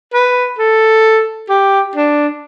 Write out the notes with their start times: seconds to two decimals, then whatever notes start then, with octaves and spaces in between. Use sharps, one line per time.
0.13 B4
0.59 A4
1.49 G4
1.95 D4